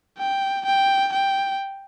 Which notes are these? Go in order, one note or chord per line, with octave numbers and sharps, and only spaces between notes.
G5
G5
G5